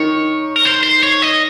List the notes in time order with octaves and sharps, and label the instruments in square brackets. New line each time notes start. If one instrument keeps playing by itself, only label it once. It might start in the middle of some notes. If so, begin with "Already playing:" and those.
Already playing: [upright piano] D#3 [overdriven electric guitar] C#5
[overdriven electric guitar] A#4
C5
C5
C#5
D#5